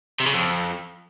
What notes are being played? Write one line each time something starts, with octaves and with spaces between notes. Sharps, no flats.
C3
C#3
F2